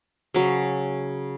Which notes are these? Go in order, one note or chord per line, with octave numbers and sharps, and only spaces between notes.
C#3 F#3